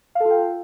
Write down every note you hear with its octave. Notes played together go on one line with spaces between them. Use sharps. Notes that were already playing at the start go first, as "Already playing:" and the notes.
F4 A4 F5 G5